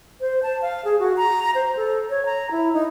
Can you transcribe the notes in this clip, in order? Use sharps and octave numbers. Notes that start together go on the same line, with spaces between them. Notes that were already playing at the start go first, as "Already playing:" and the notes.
C5
A5
F5
G#4
F#4
A#5
C5
A4
C#5
A#5
E4
D#4